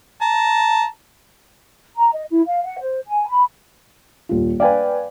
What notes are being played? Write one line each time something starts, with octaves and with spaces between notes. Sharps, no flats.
A5 A#5
A#5
D#5
E4
F5
F#5
C5
G#5
B5
D#1 F4
B4 D5 F5 G5 G#5